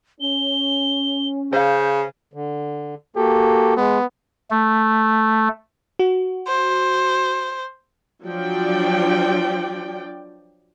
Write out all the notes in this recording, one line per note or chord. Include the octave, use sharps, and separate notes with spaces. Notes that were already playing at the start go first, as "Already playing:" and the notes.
C#4 G7
C#3 C5 F5 G6
D3
A#3 F#4 G4 A4
G#3 B3
A3
F#4
C5
F3 F#3 D4 D5 G5